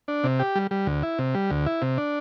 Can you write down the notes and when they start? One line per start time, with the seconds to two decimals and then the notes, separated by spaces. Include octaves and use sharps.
0.08 D4
0.24 C3
0.39 G4
0.56 G3
0.71 G3
0.87 D2
1.03 E4
1.19 C3
1.34 G3
1.50 D2
1.66 E4
1.82 C3
1.98 D4